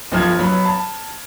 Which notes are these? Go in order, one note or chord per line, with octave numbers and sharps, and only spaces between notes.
G1 F3 F6 G#6
F#3 B3 B5
A5